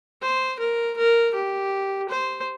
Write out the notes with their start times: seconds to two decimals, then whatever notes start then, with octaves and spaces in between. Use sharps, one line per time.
0.22 C5
0.59 A#4
0.97 A#4
1.34 G4
2.09 C5